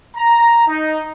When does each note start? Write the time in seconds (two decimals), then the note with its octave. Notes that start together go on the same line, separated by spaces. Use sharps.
0.17 A#5
0.68 D#4